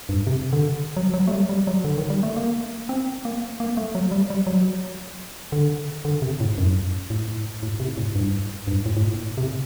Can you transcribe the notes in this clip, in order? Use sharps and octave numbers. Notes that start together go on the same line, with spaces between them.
G2
C3
D3
F#3
F#3
A3
G3
G3
F#3
D3
D#3
G3
A3
A#3
C4
A#3
A#3
A3
F#3
G3
G3
F#3
D3
D3
C3
A2
F#2
A2
A2
C3
A2
G2
G2
A2
A2
A#2
C3